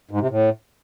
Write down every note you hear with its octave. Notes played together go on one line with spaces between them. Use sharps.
G#2
C3
A2